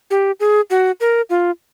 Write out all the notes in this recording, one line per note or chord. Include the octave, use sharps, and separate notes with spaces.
G4
G#4
F#4
A#4
F4